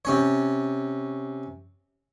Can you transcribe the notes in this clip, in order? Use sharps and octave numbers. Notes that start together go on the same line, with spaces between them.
C3 C#4 C#5